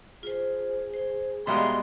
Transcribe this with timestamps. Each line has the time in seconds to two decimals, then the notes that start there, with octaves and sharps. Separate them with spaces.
0.23 F4 G#4 C5
0.93 C5
1.47 B2 G3 G#3 E5 F5 A#5 C6